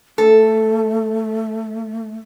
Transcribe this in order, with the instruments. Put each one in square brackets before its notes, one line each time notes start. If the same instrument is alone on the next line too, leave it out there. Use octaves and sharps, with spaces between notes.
[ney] A3 [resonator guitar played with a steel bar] A4